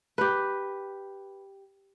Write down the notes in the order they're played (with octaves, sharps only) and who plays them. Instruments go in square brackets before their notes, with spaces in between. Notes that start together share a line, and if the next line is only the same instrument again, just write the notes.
[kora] G4 B4